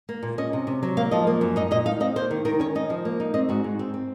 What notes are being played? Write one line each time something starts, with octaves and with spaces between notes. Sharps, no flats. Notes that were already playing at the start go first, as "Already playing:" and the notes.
A#3
A#2
C#4 D#5
C3
C3
F#3
A#3 F5
F3 D#5
A#3
F#2
D#4 D#5
A#2 D#5
D#4 F5
C4 D#5
A#3 C5
D#3
D#3 A#4
C#4 C#5
D#4 D#5
F3
A#3
D#4
C4 D#5
G#2 F#4
G#2
C4
C4